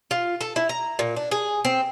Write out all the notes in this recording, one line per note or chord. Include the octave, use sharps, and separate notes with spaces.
F4
A4
E4
A#5
A#2
D4
G#4
C4